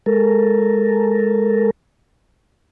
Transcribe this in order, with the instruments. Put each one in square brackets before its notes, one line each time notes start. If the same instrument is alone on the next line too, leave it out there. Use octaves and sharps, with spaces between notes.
[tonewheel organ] G#3 A4 A#4